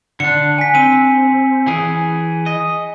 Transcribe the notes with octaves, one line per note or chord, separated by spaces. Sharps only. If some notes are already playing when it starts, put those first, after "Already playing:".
D3 D4 C#7
G#5 B6
C4 D#7
E3 G#4
D#5